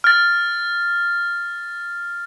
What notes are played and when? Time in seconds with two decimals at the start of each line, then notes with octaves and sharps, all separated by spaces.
0.04 F6 A6